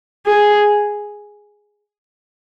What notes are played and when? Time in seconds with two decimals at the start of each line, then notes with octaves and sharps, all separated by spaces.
0.26 G#4